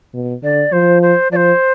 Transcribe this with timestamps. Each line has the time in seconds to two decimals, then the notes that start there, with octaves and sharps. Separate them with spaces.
0.14 B2
0.43 D3 D5
0.72 F3 C5
1.02 C5
1.32 F3 D5
1.36 C5